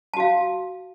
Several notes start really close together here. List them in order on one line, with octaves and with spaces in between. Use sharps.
A5 F#4 F5